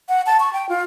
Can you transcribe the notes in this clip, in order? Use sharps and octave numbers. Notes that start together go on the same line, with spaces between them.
F#5
A5
C#6
G5
F4